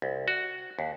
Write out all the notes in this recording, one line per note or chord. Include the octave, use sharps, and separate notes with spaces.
C2
F#4
D#2